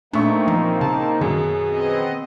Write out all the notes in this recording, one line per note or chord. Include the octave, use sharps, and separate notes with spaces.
A#1 A3 A#3 C4 D4 D#4 E5 C#6
F3
C#3 A5
F#2 B2 D#3 G#4
B3 C4 D#5